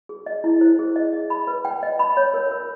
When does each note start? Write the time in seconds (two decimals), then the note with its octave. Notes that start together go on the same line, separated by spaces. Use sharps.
0.09 G#4
0.26 D#5
0.44 E4
0.61 C5
0.79 G#4
0.96 D#5
1.13 D#5
1.30 B5
1.47 B4
1.65 G5
1.83 D#5
1.99 B5
2.17 C#5
2.34 A#4
2.51 A#4